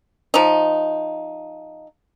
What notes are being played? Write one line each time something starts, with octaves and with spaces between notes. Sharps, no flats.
F3 D#4